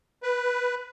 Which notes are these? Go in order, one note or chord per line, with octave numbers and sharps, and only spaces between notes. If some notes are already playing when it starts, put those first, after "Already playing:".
B4